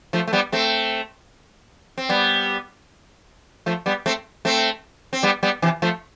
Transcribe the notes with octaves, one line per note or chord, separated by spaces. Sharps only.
F3 A3
A3
G3 B3
A3 C4
C4
G3 B3
F3 A3
G3 B3
A3 C4
A3 C4
C4
G3 B3
G3 B3
C3 E3
F3 A3